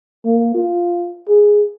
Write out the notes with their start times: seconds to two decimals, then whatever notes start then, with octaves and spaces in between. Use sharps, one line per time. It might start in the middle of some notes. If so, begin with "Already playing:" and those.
0.25 A#3
0.54 F4
1.28 G#4